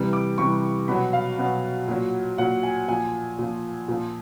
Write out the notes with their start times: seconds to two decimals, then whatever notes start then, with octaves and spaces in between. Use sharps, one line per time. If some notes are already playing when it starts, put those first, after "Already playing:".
Already playing: C3 E3 G3
0.13 D6
0.38 C3 E3 G3 C#6
0.88 B2 F#3 B5
1.13 F5
1.39 B2 F#3
1.88 A#2 F#3
2.38 A#2 F#3 F#5
2.63 G#5
2.88 A#2 F3 G#5
3.38 A#2 F3
3.88 A#2 F3